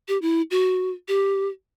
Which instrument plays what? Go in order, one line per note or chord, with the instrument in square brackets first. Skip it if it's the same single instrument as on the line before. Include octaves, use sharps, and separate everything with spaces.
[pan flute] G4
E4
F#4
G4